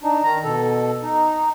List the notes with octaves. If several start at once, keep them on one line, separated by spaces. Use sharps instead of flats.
D4 D#4
D#3 A#5
B2 A4
D#4